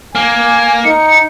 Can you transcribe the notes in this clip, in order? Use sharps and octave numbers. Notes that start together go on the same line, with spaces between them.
A#3 G#5
D#4 C#7